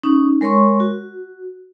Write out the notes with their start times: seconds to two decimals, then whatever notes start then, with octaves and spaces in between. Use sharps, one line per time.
0.03 C#4 D#4
0.41 G#3 A#4 C#5 C6 C#6
0.80 F#4